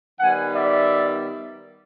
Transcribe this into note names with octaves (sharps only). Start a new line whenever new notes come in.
D#3 G3 B3 F#5 G#5
D5 E5